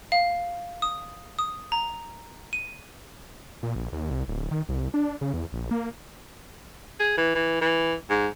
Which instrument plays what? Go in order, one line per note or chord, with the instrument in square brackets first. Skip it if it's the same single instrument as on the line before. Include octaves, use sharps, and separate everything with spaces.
[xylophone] F5
D#6
D#6
A#5
D#7
[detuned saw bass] A#2
A#1
D#2
C2
D1
D#3
C2
D4
C#3
E2
A#1
A#3
[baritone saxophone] G#4
E3
E3
E3
G#2